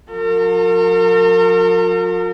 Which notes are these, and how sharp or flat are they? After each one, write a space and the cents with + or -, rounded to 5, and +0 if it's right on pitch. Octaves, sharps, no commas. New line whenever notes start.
F3 +45 A#4 -40